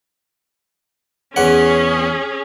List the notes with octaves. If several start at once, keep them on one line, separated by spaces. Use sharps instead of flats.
E2 C#4 G#4 F#5